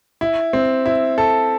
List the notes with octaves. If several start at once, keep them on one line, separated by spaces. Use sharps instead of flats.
E4
C4
E4
A4